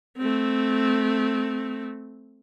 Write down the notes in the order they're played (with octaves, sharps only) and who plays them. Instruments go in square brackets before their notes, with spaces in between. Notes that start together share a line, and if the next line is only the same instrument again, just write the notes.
[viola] A3 C4